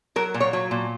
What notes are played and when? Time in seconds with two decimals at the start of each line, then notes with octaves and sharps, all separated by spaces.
0.16 F#3 A#4
0.34 A#2
0.40 C#5
0.53 F#3
0.71 A#2